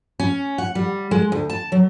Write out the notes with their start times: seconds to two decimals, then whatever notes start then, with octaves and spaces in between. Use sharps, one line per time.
0.20 C#4
0.58 F#5
0.75 G3
1.11 G#3
1.32 D2
1.50 A5
1.72 F#3